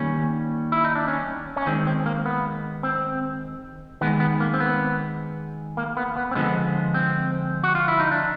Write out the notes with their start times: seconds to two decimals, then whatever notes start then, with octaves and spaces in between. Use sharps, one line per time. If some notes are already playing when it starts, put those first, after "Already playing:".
Already playing: D#3 G3 A#3 C#4
0.72 E4
0.84 D#4
0.95 D4
1.08 C#4
1.56 C#4
1.66 D#3 G#3 C4
1.87 C4
2.06 A#3
2.26 B3
2.83 C4
4.01 D#3 G#3 B3
4.20 B3
4.40 A#3
4.54 C4
4.60 B3
5.77 A#3
5.97 B3
6.16 B3
6.31 C4
6.35 D3 F3 G#3 B3
6.94 C4
7.64 F#4
7.75 F4
7.88 E4
8.00 D#4
8.11 D4